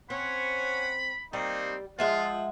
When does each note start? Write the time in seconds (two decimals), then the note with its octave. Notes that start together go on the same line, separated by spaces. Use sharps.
0.10 C4 C#4 C#5 F#5 B5
1.33 G3 A#3 C4 D#4
1.99 F3 G#3 F4 E5 F#5